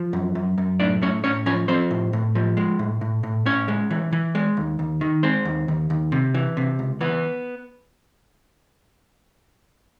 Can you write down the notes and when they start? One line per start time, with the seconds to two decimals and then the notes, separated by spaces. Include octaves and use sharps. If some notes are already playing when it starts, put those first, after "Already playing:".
Already playing: F3
0.13 F#2
0.35 F#2
0.58 F#2
0.80 A2 D4 D5
1.02 A2 C#4 C#5
1.24 A2 C#4 C#5
1.46 F3 C#4 C#5
1.68 F3 C4 C5
1.91 A2
2.13 A2
2.35 F3
2.57 G#3
2.79 A2
3.01 A2
3.23 A2
3.46 A2 C#4 C#5
3.68 G#3
3.91 E3
4.13 E3
4.35 G#3
4.57 D#2
4.79 D#2
5.01 D#3
5.23 G#3 C4 C5
5.45 D#2
5.68 D#2
5.90 D#2
6.12 C3
6.34 E3
6.57 C3
6.79 C#2
7.01 E3 B3 B4